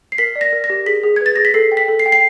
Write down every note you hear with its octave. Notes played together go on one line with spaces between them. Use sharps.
C7
A#4 B6
D5
A#6
A#4
A#6
G4
G#4 B6
G#4
B4 G#6
A6
G#4 A#6
B6
A4 C7
G5
B6
A4
C7
G5
C7